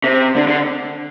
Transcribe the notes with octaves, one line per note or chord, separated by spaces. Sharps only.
C3
D3
D3